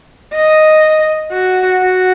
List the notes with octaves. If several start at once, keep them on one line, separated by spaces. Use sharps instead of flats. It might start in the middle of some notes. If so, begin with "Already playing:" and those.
D#5
F#4
F#4